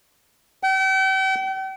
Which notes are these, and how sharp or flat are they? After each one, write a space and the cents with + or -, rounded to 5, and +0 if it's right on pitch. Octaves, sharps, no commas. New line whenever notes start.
G5 -40